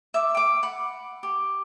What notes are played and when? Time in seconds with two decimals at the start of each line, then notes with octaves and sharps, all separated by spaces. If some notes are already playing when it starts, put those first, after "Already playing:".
0.14 E5 D6
0.35 G5 D6
0.63 F#5 B5
1.23 G4